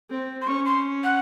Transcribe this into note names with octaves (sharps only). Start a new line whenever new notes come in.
C4
C6
C#4 C#6
C6
F#5